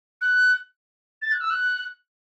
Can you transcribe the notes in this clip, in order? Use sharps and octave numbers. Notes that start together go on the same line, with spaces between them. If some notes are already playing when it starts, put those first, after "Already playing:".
F#6
A6
F#6
E6
F#6